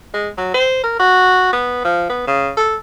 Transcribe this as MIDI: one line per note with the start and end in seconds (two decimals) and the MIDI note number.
0.14 0.29 56
0.37 0.52 54
0.54 0.82 72
0.84 0.95 70
1.00 1.52 66
1.53 1.83 59
1.84 2.09 53
2.09 2.27 59
2.27 2.50 49
2.57 2.75 69